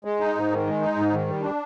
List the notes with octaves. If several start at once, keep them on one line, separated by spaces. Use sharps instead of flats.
G#3
D#4
G#2
D#3
G#3
D#4
G#2
D#3
G3
D4